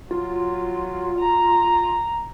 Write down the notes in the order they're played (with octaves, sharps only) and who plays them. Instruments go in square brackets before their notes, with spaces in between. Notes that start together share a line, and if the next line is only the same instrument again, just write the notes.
[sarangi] F#3 [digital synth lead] F4
[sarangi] A#5